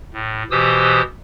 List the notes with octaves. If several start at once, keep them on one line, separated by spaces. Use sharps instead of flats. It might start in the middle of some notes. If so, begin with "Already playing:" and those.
A2
B2 E3 G4 C5 D#6 E6